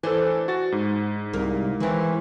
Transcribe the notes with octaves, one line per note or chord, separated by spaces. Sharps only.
E3 D4 A4 C5 D#5
F#4 A6
G#2
C2 A#3
D#3 E3 C4